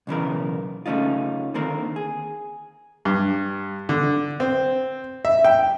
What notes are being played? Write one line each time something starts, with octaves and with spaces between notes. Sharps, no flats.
B1 C#3 E3 A#4
C#3 A3 C#4 D#4 F4
D3 D#3 A#3 C4 A#4
G#4
G2
D3
C4
E5
G5